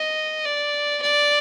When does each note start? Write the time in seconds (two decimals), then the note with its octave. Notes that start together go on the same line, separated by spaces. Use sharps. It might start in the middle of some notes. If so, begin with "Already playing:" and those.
Already playing: D#5
0.45 D5
1.02 D5